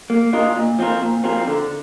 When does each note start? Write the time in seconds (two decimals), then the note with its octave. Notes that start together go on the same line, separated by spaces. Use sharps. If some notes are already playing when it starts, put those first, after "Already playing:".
0.10 A#3
0.33 D4 F4 A#4 D#5
0.56 A#2
0.79 F3 C4 F4 A#4
1.02 A#2
1.24 F3 C4 F4 A#4
1.47 D3